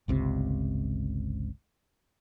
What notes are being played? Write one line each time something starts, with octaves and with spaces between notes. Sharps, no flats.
G1 C#2 C3